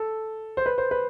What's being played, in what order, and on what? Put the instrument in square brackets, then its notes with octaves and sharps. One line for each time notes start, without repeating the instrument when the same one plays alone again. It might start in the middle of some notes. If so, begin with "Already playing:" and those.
Already playing: [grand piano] A4
C5
B4
C5
B4